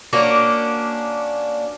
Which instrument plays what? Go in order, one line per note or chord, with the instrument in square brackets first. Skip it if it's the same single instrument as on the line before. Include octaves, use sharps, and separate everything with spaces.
[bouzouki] A#3 C#4 D4 F#4